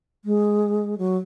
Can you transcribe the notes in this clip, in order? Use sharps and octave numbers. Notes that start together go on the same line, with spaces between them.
G#3
F#3